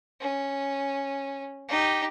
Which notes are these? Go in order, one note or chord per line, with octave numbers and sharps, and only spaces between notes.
C#4
D#4 G4